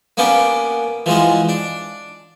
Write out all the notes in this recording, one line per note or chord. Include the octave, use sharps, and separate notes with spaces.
A#3 B3 C#4 D4 G4
E3 F3 G#3 F#4
D4